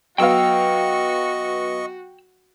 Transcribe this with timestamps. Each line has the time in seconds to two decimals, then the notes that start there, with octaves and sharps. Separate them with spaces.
0.18 F#3 B3 F#4 D#5 F5 G5 C#6 E6